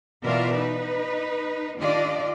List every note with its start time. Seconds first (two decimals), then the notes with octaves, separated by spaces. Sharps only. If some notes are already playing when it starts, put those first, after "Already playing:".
0.23 B2 E3 F4 A#4 D5 E5
0.55 D#4 B4
1.78 D#3 D4 F4 G4 D5 D#5